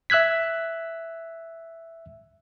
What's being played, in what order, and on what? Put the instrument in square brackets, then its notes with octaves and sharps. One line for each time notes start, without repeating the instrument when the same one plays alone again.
[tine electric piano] E5 E6 F#6 G#6 B6